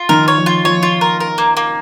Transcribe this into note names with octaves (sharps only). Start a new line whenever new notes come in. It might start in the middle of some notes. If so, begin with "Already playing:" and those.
Already playing: F4
D#3 A#4
C#5
F3
F4
F3 C#5
F4
A#4
A#4
A#3
A#3